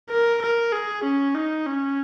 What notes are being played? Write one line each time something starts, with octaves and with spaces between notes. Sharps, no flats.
A#4
A#4
G#4
C#4
D#4
C#4